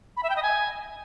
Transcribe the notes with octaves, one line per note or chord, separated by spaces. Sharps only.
B5
E5
G5
D#5
G#5